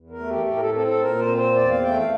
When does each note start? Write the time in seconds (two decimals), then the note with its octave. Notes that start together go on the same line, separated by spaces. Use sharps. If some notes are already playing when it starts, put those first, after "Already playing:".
Already playing: E2
0.10 A#4
0.19 A3
0.29 G4
0.46 A2 G4
0.56 A#4
0.60 A4
0.73 C4 A4
0.87 A4
1.01 A#2 A#4
1.19 C5
1.28 C4
1.37 C5
1.55 E2 D5
1.70 F5
1.83 A3 G5
1.97 F5